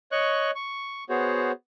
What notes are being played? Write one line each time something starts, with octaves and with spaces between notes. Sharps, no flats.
C#5 D#5 C#6 F#6
C#6
B3 F#4 G#4 C5 C#5